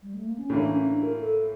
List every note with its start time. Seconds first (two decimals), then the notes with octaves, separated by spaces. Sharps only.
0.02 G3
0.14 A3
0.26 A#3
0.38 C#4
0.50 A2 E3 A#3 D4
0.67 C#4
0.85 D4
1.03 A#4
1.21 A4